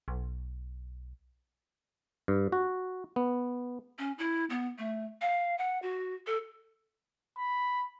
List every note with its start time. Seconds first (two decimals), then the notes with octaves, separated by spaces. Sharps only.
0.08 B1
2.28 G2
2.52 F#4
3.16 B3
3.99 C#4
4.18 E4
4.50 B3
4.78 A3
5.22 F5
5.58 F#5
5.82 F#4
6.27 A4
7.38 B5